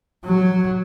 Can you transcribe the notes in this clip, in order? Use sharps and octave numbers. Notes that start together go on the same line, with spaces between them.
F#3